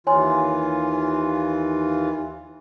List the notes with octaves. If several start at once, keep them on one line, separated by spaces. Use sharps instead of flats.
D#2 E3 F4 C#5 G#5 C6